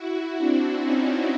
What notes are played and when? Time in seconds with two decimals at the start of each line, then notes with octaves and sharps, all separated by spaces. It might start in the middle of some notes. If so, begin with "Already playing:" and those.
Already playing: E4 F#4
0.38 C4 D4
0.83 C#4 D#4